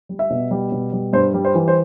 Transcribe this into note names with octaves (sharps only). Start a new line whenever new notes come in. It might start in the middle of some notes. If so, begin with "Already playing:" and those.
G3
E5
B2
G3
B2
G3
G2 C5
G3
C5
E3
C5